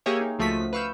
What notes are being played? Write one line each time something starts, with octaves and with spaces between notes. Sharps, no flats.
A#3 G4 G#4 A#4 C#5 E5
D#4
C#2 F3 A3 F#4 D#6 B6
B4 F5 C#6 E6 G6